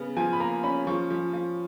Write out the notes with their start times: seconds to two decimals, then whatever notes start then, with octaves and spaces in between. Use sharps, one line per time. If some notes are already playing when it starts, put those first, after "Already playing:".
Already playing: C#3 B3
0.17 F3 G#5
0.33 B5
0.40 A#3 A#5
0.63 C#4 B5
0.87 F3 C#6
1.10 F3
1.33 F3